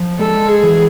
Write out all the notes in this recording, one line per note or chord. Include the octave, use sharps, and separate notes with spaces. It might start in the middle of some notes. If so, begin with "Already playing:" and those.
Already playing: F3
G#3 A4
G#4
E3